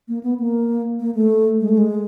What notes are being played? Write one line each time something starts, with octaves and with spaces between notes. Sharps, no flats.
A#3
B3
A#3
A#3
A3
G#3
A3
G#3